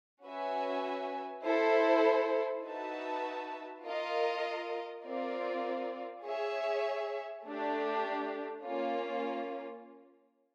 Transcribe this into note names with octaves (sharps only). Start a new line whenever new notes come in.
C#4 F#4 B4 E5 G#5
E4 A4 C5
D#4 F#4 B4 E5 A5
F4 A#4 D#5
C4 F4 A#4 D5
G#4 C#5 E5
A3 D4 G4
A#3 C#4 F4